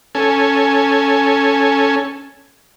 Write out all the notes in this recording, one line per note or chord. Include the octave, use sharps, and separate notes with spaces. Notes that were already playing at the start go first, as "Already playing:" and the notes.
C#4 A4 G#5